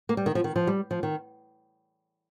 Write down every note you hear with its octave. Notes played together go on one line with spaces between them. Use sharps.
A#3
G3
D#3
F3
D#3
F3
G3
F3
D#3